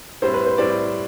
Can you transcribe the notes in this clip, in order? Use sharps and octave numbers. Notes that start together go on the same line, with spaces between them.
A2 G3 C4 C5
B4
C5
A2 G3 C4 D5